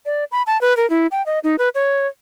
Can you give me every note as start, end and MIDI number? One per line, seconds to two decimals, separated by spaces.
0.06 0.24 74
0.32 0.42 83
0.47 0.60 81
0.61 0.76 71
0.77 0.88 70
0.90 1.07 64
1.11 1.24 79
1.26 1.39 75
1.44 1.56 63
1.59 1.69 71
1.75 2.07 73